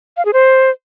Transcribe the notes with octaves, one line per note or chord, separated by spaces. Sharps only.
F5
G#4
C5